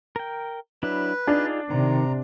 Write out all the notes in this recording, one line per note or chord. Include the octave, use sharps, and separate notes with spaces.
A#4 G5
F#3 D4 E4 B4
D4 D#4 F4 G#4
C3 D#3 A#5